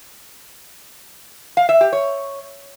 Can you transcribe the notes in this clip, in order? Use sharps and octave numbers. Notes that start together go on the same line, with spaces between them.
F5
E5
G4
C#5